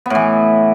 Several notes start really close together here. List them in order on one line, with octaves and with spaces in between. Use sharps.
B3 A2 E3